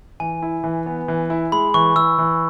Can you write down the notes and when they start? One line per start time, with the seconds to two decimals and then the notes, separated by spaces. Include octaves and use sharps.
0.20 E3 G#5
0.42 E4
0.64 E3
0.86 B3
1.08 E3
1.30 E4
1.52 G#3 B5
1.74 E3 C#6
1.96 E3 E6
2.18 E3